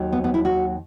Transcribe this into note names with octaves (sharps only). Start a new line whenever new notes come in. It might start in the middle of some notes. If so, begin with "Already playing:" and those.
Already playing: D#2 D#3 F#3
B3
B3
E4
F#4